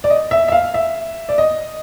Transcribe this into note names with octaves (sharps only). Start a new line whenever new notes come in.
D5
D#5
E5
E5
F5
E5
D5
D#5